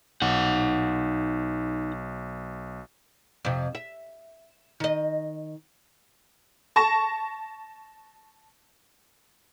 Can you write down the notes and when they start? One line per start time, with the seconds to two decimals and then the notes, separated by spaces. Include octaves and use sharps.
0.22 B1 D#4 F#5
3.45 F2 C3
3.75 E5
4.80 D#3 D#5
6.76 A5 C#6 A#6 E7